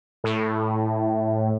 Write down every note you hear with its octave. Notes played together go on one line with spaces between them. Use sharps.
A2